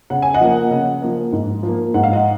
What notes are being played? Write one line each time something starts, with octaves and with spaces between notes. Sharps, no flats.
C#3 F#5
G#5
D#5 F#5
F3 A#3
C#3
F3 A#3
G#2
F3
A#3
G#2 F#5
F5
D#5 F#5